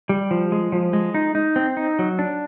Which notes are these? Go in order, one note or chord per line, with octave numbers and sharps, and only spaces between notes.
G3
F3
G#3
F3
G#3
D#4
D#4
C4
D#4
F#3
D4